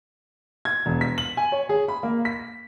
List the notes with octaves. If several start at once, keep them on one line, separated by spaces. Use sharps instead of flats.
G#6
E1
B6
F#7
G#5
C#5
G#4
B5
A#3
B6